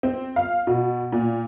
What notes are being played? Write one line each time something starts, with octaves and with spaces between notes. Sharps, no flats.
C4
F5
B2
A#2